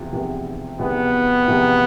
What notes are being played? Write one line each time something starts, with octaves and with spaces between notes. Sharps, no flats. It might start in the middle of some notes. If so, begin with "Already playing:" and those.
Already playing: E2 C3 F3
E2 C3 F3
E2 C3 F3 B3
E2 C3 F3